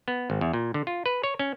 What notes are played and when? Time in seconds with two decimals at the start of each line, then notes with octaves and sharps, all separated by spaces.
0.08 B3
0.30 G#1
0.41 E2
0.53 A#2
0.74 D3
0.87 F4
1.06 B4
1.24 C#5
1.39 C#4